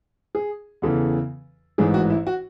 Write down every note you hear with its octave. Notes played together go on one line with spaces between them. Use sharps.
G#4
E2 C#3 E3 A4
A1 G#2 E3 G#4
F#4
E4
F#4